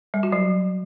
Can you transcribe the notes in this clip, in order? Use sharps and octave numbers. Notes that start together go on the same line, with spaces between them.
G3
F#4
F#3